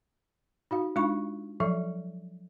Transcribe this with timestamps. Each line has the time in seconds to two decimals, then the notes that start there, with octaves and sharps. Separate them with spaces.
0.71 D#4 F#4 F5
0.96 G#3 D4 D#4 F4 F5 C#6
1.60 F3 F#3 A4 E5